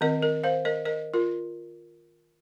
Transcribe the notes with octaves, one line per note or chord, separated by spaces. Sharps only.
D#3 C4 A#4 D#5
A#4 D#5
C5 F5
A#4 D#5
A#4 D#5
F4 A#4